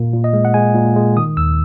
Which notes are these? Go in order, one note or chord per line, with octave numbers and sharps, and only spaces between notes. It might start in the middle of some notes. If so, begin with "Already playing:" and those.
Already playing: A#2 A#3
A#2
D#5
G#3
F#5
G#3 G#5
A#2
G#3
D#3 D#6
D#2 E6